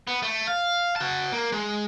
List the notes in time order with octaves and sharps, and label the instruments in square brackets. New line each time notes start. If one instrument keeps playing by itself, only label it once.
[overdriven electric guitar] B3
A3
F5
F#4 A5
A#3
G#3